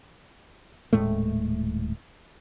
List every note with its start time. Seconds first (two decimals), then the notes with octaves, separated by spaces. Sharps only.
0.93 D#1 A2 G#3 A3